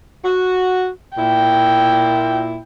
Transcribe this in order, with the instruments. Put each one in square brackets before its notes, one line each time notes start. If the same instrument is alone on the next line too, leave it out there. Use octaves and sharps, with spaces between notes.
[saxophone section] F#4
[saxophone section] A#2 E4 [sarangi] G5